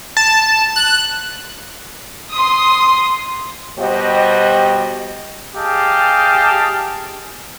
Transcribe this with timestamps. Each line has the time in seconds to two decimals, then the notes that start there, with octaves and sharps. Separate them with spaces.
0.17 A5
0.76 F#6
2.30 C6 D#6
3.79 B2 G3 F#4 G4 C5 D#5
5.56 G4 G#4 D#5 F5 G5 A5